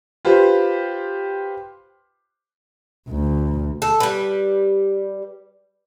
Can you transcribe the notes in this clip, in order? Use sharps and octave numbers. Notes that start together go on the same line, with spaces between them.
F4 G4 B4 C5
D2
A4
G3 B4